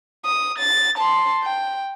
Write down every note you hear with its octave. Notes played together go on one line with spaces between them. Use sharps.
D#6
A6
A5 C6
G5